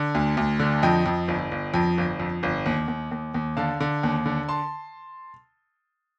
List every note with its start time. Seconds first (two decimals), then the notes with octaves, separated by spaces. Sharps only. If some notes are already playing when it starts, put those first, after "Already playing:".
Already playing: D3
0.15 D2
0.37 D2
0.59 D3
0.82 F2 D#5 G5
1.06 F2
1.28 G1
1.51 G1
1.74 F2
1.98 G1
2.20 F2
2.43 G1
2.66 D#2
2.88 D#2
3.11 D#2
3.34 D#2
3.57 D3 F5 A5
3.80 D3
4.03 D#2
4.26 D3
4.49 A5 C6